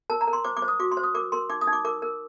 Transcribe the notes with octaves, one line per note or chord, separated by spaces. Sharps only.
A#4 A5
A#5
A#4
C6
C5 D6
D6
C5
D#6
F#4 D6
C6
C5
D#6
A#4 D6
A#4 C6
D#4 D6
D#6
D#4
D6
A#4 D6
A#4